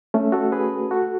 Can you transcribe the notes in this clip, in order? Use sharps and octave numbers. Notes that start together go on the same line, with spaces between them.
A3 C#4
F#4 A4
G#4 B4
F#4 A4